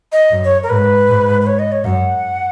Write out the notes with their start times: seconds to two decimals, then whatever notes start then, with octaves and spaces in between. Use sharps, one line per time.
0.12 D#5
0.31 F#2
0.44 C#5
0.63 A#4
0.70 G#2 B4
1.08 G#2
1.41 B4
1.47 C#5
1.59 D#5
1.72 C#5
1.84 F#2 F#5